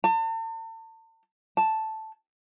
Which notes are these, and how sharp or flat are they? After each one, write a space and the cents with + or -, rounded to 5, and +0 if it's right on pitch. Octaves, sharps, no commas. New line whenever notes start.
A5 +40
A5 +0